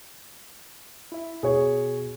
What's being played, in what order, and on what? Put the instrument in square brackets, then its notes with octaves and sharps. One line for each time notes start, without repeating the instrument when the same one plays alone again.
[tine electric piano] E4 E5
[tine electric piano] B2 [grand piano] G#4 C#5